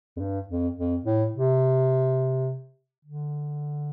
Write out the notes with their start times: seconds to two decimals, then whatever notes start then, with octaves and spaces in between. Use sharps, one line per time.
0.16 F2
0.20 G2
0.48 F2
0.76 F2
1.05 A2
1.34 C3
3.05 D3